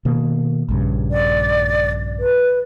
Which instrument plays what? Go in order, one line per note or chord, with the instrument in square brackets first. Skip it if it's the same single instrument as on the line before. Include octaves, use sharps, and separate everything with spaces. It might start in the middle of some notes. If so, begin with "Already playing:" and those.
[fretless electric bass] B2 D#3 A#3
A#1 G2 C#3
[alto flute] D5
B4